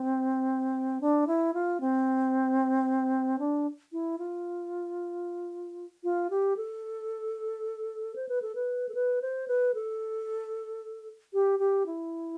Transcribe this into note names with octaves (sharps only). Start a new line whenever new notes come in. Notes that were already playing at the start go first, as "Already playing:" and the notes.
Already playing: C4
D4
E4
F4
C4
D4
E4
F4
F4
G4
A4
C5
B4
A4
B4
A4
B4
C5
B4
A4
G4
G4
E4